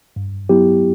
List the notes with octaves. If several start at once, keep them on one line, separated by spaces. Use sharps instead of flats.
G2
F#3 B3 E4 G4